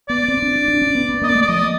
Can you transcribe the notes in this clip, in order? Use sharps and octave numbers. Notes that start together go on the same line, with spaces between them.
B3 D5
C4
D4
D4
D4
C#4
B3
B3
A#3 D#5
D5
A3
D5
F3 D#5